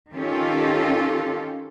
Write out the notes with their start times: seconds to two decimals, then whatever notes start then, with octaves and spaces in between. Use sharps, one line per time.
0.13 D#3 C#4 F4 G4 A4